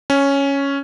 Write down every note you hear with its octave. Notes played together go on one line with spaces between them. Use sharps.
C#4